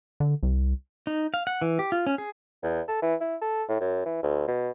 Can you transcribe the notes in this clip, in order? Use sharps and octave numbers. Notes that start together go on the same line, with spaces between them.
D3
C2
D#4
F5
F#5
E3
G4
F4
C#4
G#4
E2
A4
E3
E4
A4
A2
F#2
E3
D2
B2